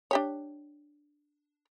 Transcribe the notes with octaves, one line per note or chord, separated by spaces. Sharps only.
D4 G4 C#5